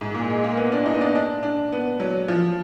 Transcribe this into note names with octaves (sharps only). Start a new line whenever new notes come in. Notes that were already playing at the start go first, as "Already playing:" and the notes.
G#2
A#2
G#3
A#3
B3
D4
D#4
B3
D4
D4
D4
B3
F#3
F3